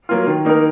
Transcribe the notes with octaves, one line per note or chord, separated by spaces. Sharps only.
F#3 A#3 F4
D#3
A#3 D#4 A#4